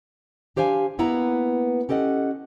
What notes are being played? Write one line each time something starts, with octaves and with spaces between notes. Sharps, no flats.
D4 G4 C5 F5 F#5 G#5
A#3 B3 E4 B4 A#5
C#4 G4 A4 D#5 F#5